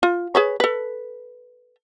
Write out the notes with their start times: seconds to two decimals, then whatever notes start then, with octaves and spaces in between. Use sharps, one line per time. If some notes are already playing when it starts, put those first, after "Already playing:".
0.03 F4
0.35 G#4 B4 C#5
0.60 A4 B4